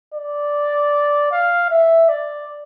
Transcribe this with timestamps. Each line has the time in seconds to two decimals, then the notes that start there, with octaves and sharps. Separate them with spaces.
0.14 D5
1.32 F5
1.70 E5
2.08 D5